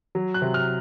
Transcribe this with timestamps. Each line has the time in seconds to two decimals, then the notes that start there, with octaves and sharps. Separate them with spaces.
0.15 F#3
0.34 F#6
0.42 C3
0.54 F6